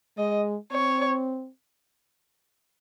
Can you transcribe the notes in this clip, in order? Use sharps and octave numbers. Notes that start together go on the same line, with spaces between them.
G#3 D#5
C4 C#5